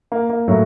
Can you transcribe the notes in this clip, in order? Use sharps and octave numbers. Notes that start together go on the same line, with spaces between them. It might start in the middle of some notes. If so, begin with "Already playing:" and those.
A#3
A#3
A2 F#3